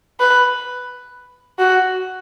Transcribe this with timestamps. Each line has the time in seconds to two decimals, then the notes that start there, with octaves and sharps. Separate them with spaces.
0.20 B4
1.59 F#4